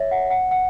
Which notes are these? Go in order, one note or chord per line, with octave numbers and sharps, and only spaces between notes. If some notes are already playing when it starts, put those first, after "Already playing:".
Already playing: C#5 E5
F#5
F#5
F#5